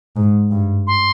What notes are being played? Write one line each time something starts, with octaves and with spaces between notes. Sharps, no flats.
G#2
G2
C6